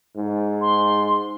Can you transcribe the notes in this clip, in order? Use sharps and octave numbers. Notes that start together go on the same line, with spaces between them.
G#2
C6